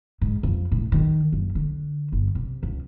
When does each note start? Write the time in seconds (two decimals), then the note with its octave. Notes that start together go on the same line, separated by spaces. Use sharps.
0.21 G#2
0.43 F2
0.72 A2
0.92 D#3
1.32 F#1
1.55 D3
2.12 G1
2.35 C3
2.63 C#2